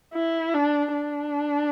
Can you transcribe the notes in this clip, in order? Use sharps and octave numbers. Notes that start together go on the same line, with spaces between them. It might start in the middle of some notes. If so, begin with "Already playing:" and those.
E4
D4
D4